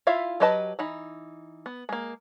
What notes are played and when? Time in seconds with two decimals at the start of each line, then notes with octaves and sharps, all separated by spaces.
0.07 E4 F4 E5 F5
0.40 F#3 G4 B4 D#5 A5
0.79 E3 D#4 B5
1.66 B3
1.89 G#3 A#3